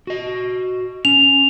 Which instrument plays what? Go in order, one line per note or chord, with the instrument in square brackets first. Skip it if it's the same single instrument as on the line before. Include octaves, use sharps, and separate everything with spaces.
[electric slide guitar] F#4 D#5
[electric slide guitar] C#4 [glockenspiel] F7